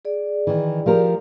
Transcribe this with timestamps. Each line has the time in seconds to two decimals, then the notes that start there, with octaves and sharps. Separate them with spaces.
0.05 G#4 D5
0.47 D#3 E3
0.86 F3 G4 A#4